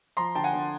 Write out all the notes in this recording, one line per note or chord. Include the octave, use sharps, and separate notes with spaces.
F3 A#5 C6
D3 G5 A5
F#5 G#5
D3